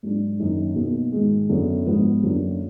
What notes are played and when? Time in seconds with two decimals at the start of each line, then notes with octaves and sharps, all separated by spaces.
0.03 G#2 F#3 D4
0.39 F#2 D#3 A#3 D#4
0.76 B2 A#3 D#4
1.12 G#2 D#3 G#3
1.49 F#2 D3 F#3 B3
1.85 G#2 F3 B3
2.23 F#2 D3 F#3 A#3 D4